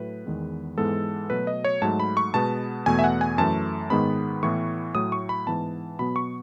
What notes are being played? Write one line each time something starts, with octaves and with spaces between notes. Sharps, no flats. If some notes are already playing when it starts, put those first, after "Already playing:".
Already playing: A2 F#3 A3 B4
E2 D#3 G#3 B3
G#2 E3 G#3 B3 A4
B2 F#3 A3 B4
D#5
C#5
G#2 F#3 A3 A5
B5
C#6
B2 G#3 B3 A5
E2 B2 A3 G#5
E5
F#5
G#5
F#2 E3 A3 A5
G#2 D#3 G#3 B3 B5
A2 E3 B3 C#6
A2 F#3 A3 D#6
C#6
B5
G#2 E3 B3 A5
B2 F#3 B3 B5
C#6